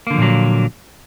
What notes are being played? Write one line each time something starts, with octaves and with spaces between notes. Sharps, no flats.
A#2 D3 F3 F#3 A#3